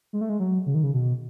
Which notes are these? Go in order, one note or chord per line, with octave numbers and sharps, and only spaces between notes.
G#3
A3
G#3
F#3
C#3
D#3
C#3
B2